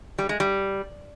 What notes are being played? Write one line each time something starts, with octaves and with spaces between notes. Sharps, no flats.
G3
G#3
G3